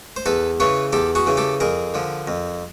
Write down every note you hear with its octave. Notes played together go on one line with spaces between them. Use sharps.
C5
E2 A4 B4
C#3 E3 B4 C#5
E2 G4 A4
F#4 G#4
C#3 E3
G4 A4
F2 G#4 A#4
D3 F3
F2